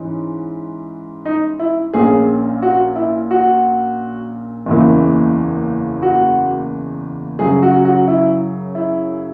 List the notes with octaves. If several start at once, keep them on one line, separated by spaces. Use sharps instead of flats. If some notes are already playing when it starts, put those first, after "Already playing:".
Already playing: G#2 E3 C#4
D#4
E4
A#1 A#2 A#3 C#4 G#4
F#4
E4
F#4
F#1 E2 C#3 E3 A#3
F#4
F#2 C#3 F#3 G#4
F#4
F#4
E4
E4